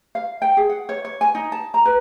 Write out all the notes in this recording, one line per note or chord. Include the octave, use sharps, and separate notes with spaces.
F5
G5
G#4
F#5
C#5
C#5
G#5
D#4
A5
A#5
B4